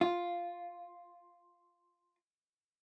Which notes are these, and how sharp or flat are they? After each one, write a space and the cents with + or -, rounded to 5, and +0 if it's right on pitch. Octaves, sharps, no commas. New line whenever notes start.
F4 +0